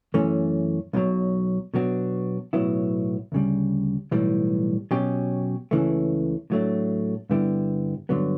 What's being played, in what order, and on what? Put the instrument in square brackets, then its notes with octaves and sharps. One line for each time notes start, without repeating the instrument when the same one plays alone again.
[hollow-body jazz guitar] F#2 E3 A3 C#4
B1 B2 F#3
B2 F#3 B3 D4 F#4
B1 A2 F#3 B3 E4
D2 C#3 G3
B1 A2 E3 G3
B2 F#3 C#4 G4
C#2 C#3 E3 A3
A2 F#3 A3 D4
G2 D3 G3 B3 E4
G2 D3 F#3 B3